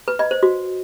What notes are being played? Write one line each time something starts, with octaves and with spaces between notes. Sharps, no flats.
B4
D#5
C5
F#4